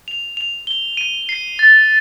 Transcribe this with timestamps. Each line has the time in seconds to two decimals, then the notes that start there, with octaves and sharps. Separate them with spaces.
0.08 F7
0.37 F7
0.67 G7
0.97 D#7
1.29 C7
1.59 A6